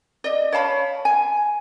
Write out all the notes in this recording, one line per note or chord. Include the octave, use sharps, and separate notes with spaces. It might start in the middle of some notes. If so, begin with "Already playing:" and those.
D5 D#5
C#5 F5 A5 B5
G#5